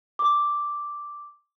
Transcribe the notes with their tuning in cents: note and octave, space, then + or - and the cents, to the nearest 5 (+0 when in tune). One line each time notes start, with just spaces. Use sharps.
D6 -5